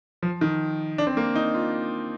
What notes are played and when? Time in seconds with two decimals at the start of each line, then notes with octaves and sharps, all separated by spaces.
0.23 F3
0.41 D#3
0.98 D4
1.07 C4
1.17 A#3
1.35 D#4
1.54 F4